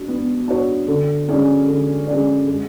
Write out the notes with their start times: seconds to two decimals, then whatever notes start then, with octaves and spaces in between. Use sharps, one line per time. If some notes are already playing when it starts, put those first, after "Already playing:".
Already playing: D4 F#4
0.08 B3
0.48 D4 F#4 C#5
0.88 D3
1.28 G#3 C#4 G#4 D5
1.68 D3
2.07 G#3 C#4 G#4 D5
2.48 G#3